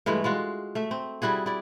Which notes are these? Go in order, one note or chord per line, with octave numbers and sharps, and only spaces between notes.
G2 E3 G#3 A3
G#3 F4 F#4
A3 E5
C4
G3 E4 F#4 G#4
E4 D5